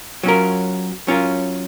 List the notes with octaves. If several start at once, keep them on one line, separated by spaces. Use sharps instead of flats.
F#3 C#4 F4 A#4
F#3 C#4 F4 A#4